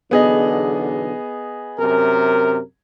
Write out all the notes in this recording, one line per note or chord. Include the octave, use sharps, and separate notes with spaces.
B1 E2 D3 B3 G#4 D#5
F#2 C3 A#4